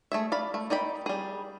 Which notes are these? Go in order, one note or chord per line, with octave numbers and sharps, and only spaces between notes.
A3 G#4 E5
D5 F5 B5
A3
D#4 D5 G5 B5
G3 G#4